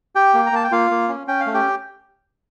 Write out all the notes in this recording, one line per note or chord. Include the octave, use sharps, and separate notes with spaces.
G4 G5
A#3
A#5
A#3 A5
G5
A#3 F4 F5
A#3
C#4
C#4 G5
F5
A3
G4 G5